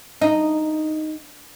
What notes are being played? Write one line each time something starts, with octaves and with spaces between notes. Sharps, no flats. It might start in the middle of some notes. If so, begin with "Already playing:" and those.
D#4